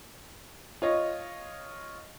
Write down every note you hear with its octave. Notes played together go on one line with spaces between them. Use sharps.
F4 C#5 D#5